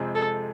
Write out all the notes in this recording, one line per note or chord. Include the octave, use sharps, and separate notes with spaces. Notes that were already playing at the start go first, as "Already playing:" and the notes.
Already playing: F2 C3 G#3 C4 G#4
A4